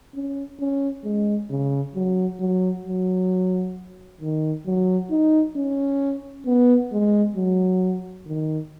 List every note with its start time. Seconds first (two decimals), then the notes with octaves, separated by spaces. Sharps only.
0.15 C#4
0.60 C#4
1.04 G#3
1.50 C#3
1.95 F#3
2.40 F#3
2.85 F#3
4.21 D#3
4.66 F#3
5.11 D#4
5.56 C#4
6.46 B3
6.92 G#3
7.36 F#3
8.27 D#3